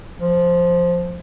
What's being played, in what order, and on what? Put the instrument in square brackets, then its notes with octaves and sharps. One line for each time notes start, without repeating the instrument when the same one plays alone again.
[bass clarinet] F3